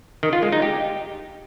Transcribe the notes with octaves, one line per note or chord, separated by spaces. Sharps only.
D#3
F4
G#3
D#4
G4